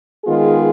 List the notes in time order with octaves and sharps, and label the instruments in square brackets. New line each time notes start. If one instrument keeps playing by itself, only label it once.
[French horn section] D#3 G#3 B3 F4 G#4